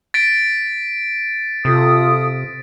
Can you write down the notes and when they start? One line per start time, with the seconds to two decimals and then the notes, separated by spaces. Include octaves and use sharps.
0.14 A6 B6 D7
1.65 C3 F4 A4 D#6